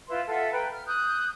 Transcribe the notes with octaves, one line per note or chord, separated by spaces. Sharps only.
E4 F4 B4 C6
F4 A4 E5 F#5
B4 G5 A#5
F6
D#6 F#6 G6